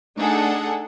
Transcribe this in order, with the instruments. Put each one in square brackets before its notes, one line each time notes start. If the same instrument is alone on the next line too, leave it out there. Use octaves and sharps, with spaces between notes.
[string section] A3 D4 D#4 G#4 A4 F#5